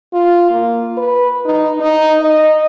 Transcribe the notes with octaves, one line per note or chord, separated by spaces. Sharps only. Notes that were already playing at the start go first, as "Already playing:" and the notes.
F4
A#3
B4
D#4
D#4
D#5